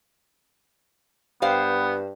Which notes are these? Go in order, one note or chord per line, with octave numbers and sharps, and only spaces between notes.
G2 B3 C5 F5 G5